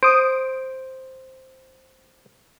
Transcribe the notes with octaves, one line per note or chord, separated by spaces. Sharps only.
C5 D#6 D7